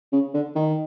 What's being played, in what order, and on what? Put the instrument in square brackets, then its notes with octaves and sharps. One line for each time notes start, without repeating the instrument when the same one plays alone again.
[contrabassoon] C#3
D3
D#3